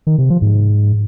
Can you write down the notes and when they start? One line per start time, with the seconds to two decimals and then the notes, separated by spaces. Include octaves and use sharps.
0.07 D#3
0.18 C3
0.30 F3
0.42 G#2